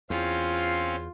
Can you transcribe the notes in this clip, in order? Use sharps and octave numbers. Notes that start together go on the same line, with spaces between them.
E2 C4 C#4 F4 F5